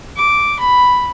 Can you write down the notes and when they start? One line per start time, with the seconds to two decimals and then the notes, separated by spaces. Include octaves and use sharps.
0.17 D6
0.59 B5